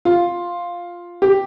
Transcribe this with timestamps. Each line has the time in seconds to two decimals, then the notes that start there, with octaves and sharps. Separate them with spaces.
0.05 F4
1.22 G4